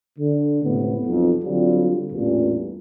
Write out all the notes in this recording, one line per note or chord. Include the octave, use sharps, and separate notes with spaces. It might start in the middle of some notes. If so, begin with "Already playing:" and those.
D3
C#2 A2 C3 B3
B1 F2
D3 F#3 G3 C4 F4
A1 E2 G2 A#2